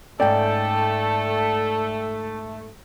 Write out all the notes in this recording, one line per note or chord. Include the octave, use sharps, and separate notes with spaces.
G#2 A3 C#4 A4 D5 G5